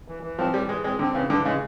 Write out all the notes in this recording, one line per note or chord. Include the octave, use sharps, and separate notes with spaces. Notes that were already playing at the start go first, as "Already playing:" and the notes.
E3
E3
F3 C4
E3 G3
E3 G#3
G#3 C4
D3 C4
C#3 E3
D3 E3
C#3 G#3